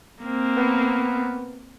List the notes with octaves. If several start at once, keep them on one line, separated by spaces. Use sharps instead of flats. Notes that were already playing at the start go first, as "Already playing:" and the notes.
A#3 C4
B3